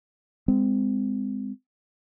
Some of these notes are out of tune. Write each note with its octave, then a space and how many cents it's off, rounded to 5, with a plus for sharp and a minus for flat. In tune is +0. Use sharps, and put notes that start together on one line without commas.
G#3 -20 C4 -25